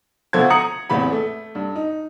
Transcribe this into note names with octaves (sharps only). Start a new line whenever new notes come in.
D2 B2 F3 A4 C5 G#6
A#5 D#6 C#7 F#7
A1 E2 C4 B5
A3
G2
D#4